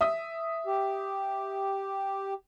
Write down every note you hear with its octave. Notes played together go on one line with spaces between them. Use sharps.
E5 D#6
G4